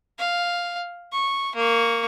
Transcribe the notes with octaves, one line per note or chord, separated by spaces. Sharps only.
F5
C#6
A#3 C#6